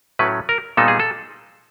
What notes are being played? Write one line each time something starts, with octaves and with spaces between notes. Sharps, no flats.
A2 F#3 A3 C#4 B4
A#4
A#2 G3 B3 D#4 A4
G#4
A4